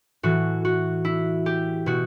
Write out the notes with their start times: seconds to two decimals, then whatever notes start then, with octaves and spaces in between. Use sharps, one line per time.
0.23 A2 E3 F#4
0.65 F#4
1.05 E4
1.46 G4
1.86 B2 F#4